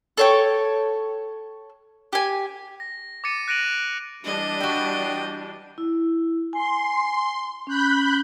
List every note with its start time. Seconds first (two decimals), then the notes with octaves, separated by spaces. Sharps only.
0.17 A4 C#5 G5
2.13 G4 G#5
2.80 A#6
3.24 D6 A6 C#7 D#7
3.48 F#6 A#6 D7 D#7 F7 F#7
4.25 E3 G3 D4 D#5
4.60 F#4 E5 G5
5.78 E4
6.53 G#5 C6
7.67 C#4 B5 F#6 G6